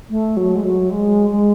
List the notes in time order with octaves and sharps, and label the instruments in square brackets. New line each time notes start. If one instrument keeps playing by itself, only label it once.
[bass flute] A3
F#3
G#3
F#3
G#3
G#3